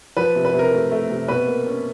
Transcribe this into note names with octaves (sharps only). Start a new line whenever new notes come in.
F3 B4
C3
B4
C3
A#4
A3
A3
C3
B2 B4
A#3
C#4